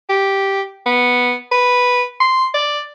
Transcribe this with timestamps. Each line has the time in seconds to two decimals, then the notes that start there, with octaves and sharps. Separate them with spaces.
0.09 G4
0.86 B3
1.52 B4
2.20 C6
2.54 D5